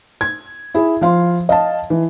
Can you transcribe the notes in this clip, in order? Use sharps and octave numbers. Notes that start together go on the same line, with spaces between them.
G#6
E4 G#4
F3 F5 C6
D#5 F5 A5
E3